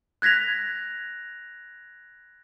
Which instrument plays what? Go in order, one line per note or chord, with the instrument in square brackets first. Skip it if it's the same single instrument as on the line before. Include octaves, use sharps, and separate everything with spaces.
[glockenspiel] F#6 G#6 A#6 B6 F7